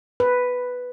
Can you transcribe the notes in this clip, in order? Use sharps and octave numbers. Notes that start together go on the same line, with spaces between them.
B4